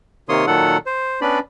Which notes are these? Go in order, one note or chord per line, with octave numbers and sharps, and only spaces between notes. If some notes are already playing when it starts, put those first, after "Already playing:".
C3 D#3 A#3 C#5 C6 D#6
A#2 D#3 F#3 A4 F#5
C5
B3 C#4 D4 B4 D5 B5